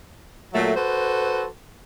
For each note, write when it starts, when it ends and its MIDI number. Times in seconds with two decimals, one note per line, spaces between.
0.54 0.72 46
0.54 0.72 54
0.54 0.72 57
0.76 1.46 66
0.76 1.46 69
0.76 1.46 71
0.76 1.46 72